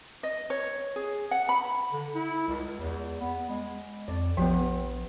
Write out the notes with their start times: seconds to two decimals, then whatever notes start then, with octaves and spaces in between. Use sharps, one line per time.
0.23 D#5
0.50 C#5
0.96 G#4
1.31 F#5
1.49 B5
1.93 D3
2.15 E4
2.48 C#2
2.80 E2
3.21 B3
3.49 G#3
4.08 F2 D5
4.37 A#1 F3 B3 G4 G5